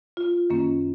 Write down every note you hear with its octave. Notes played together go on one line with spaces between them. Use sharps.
F4
F#2 D#3 A#3 C#4